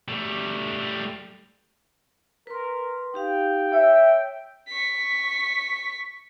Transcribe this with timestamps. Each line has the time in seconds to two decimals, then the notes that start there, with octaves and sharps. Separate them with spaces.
0.08 G3 A3
2.47 A#4 B4 C6
3.14 D#4 G4 F5 G5
3.73 C#5 E5
4.68 C#6 B6